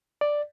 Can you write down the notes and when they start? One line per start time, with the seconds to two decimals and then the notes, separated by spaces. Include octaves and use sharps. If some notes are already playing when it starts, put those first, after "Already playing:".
0.21 D5